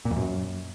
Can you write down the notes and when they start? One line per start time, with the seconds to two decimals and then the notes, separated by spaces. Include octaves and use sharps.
0.05 A#2
0.11 F2
0.16 F#2